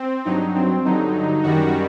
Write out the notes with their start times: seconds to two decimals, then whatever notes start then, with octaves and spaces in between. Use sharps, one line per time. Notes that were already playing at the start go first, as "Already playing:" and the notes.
Already playing: C4
0.25 G2 F#3 D#4
0.55 C4
0.84 G2 D3 F#3 D#4
1.43 F#2 D#3 G3 F#4